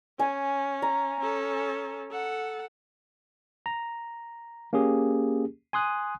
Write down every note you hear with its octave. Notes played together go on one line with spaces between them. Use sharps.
C#4 G#5
A#5
C#4 A4
A4 F#5
A#5
A#3 C#4 G4 G#4
G#5 C6 D#6 F#6